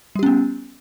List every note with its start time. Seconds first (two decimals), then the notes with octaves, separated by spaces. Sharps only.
0.15 G3
0.19 G4
0.23 C#4
0.26 B3